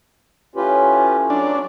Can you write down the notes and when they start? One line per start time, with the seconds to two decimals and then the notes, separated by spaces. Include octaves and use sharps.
0.56 A2 C#4 F4 G4 B4
1.30 F#3 D4